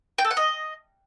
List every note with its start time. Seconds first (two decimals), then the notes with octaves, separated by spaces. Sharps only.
0.18 G5
0.25 A4
0.31 F#5
0.37 D#5